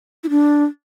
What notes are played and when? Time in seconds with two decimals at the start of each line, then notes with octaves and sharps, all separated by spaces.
0.24 E4
0.30 D4